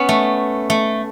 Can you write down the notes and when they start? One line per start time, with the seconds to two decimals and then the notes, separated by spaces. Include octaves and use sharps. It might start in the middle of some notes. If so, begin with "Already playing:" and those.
Already playing: B3 C#4
0.09 A3
0.70 A3